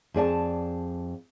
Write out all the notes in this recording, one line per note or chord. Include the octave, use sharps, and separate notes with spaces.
F2 G#4 D5 A5